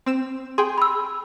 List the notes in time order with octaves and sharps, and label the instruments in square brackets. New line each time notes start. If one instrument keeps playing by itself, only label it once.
[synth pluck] C4 E6 E7
[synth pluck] G#4 G5 [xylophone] C6
[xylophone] B5 E6